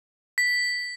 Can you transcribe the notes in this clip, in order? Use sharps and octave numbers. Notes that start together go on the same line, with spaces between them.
B6